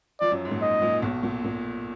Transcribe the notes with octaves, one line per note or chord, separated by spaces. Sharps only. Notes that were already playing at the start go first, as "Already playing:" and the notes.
F3 F4 D5
F#2 F#3
G#2
A#2
G#2 D#5
A#2
B1 B2
A#2
A#2